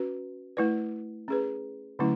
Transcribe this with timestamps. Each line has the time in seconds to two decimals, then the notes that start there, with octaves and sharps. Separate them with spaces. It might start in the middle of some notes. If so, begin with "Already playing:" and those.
Already playing: C#4 F#4 B4
0.57 A3 E4 B4 D5
1.28 C#4 G#4 B4
1.99 D3 F#3 A3 C#4 E4